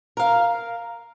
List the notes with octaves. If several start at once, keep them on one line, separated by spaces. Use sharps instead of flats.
A#4 F5